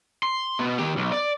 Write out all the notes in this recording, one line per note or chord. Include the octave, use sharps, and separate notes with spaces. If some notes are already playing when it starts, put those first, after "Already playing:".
C6
B2 B3
D#3 G4
B1
D5